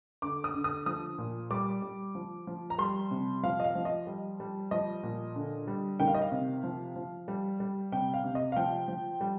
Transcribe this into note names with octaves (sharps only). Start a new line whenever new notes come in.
D3 D6
D#6
D3
D#6
F3 D#6
A#2
G3 D6
G3
F3
F3
A#5
G3 C6
C3
F3 F5
D#5
F5
F3
D#5
G3
G3
F3 D#5
A#2
D3
G3
D#3 G5
F5
D#5
F5
C3
F3
F3
G3
G3
C3 G5
F5
C3
D#5
F5
F3 G5
F3
G3